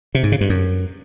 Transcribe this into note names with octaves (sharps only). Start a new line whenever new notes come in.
C3
G#2
C#3
G2
F#2